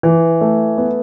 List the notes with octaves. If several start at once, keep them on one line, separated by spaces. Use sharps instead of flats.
E3
A3
B3